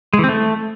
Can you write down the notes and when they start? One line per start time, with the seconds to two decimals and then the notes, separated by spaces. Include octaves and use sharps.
0.13 G#3
0.19 E3
0.24 C4
0.29 A3